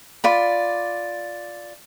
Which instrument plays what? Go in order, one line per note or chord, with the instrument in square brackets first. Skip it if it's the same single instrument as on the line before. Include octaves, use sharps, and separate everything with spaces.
[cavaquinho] F4 D5 B5